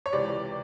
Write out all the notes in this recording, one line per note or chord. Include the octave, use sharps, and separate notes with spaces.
C#5
C#2 C3 E3 D5